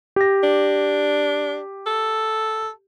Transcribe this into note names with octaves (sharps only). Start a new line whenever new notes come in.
G4 A#6
D4
A4